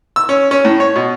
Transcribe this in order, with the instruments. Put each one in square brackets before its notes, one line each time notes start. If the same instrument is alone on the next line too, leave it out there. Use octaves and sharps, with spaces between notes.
[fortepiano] E6
C#4
C#4
A2
C#5
B2